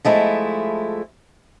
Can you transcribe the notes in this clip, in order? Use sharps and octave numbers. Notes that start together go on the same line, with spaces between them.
F3 G#3 A3 E4